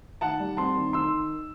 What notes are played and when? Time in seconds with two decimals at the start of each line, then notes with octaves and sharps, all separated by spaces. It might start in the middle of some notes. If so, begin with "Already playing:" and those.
0.21 D#3 F#5 A5
0.39 G3
0.57 C4 A5 C6
0.76 D#3
0.93 D#3 C6 E6